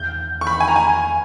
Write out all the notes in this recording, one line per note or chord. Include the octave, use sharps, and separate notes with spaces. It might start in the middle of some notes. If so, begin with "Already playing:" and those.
Already playing: E2 G6
C#6
B5
G#5
A#5
G#5